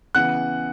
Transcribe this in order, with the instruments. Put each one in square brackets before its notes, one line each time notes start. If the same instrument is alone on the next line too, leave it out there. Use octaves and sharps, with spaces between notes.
[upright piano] C#3 E3 B3 [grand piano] F#5 F#6